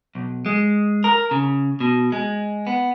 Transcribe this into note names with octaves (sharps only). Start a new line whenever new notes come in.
B1
G#3
A#4
C#3
B2
G#3
B3